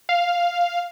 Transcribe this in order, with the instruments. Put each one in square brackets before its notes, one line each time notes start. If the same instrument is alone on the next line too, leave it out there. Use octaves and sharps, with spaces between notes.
[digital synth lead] F5